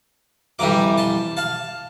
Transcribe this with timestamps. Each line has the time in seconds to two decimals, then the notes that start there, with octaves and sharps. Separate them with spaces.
0.59 F2 E3 G3 A#5 D6
0.98 A5 C6
1.37 F5 A5